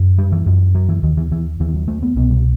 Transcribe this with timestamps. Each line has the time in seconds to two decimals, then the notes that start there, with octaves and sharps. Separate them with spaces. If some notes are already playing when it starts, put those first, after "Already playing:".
Already playing: F#2
0.18 G3
0.32 E3
0.46 F#2
0.75 F#3
0.89 E3
1.03 D#2 D#3
1.17 E3
1.31 E3
1.60 D#2 E3
1.74 F#3
1.88 A3
2.02 B3
2.16 C2 B2 B3
2.30 G3